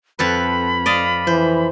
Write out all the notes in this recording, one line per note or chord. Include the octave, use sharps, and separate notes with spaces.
F2 A4 B4 B5
D5 D#5 F5
E3 C5